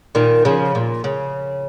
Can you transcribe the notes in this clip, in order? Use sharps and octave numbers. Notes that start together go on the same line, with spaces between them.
A#2 D#3
C#3 F3
A#2
C#3